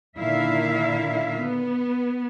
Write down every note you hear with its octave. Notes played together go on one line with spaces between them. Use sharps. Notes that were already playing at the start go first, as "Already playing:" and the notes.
A#2 D3 D#3 E4 E5 F5
B3